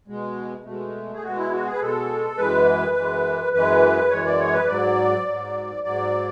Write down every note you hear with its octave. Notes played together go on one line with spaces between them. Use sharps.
B2 G#3
B2 G#3 A3
G#4
B2 G#3 F#4
E4
F#4
G#4
B4
B2 G#3 A4
F#2 E3 G#3 B4
F#2 E3 G#3
F#2 E3 G#3 B4
F#2 E3 G#3 C#5
D5
C#5
B4
G#2 F#3 D5
G#2 F#3
G#2 F#3 D5